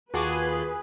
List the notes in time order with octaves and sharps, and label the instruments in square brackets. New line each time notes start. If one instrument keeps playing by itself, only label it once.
[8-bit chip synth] D#2 F4 F#6 [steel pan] F#4 A5 D6 [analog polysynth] G#4 [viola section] B4